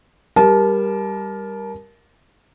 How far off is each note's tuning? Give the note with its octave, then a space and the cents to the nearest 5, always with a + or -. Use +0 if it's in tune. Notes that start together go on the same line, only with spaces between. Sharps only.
G3 +10 A#4 +10 A5 -25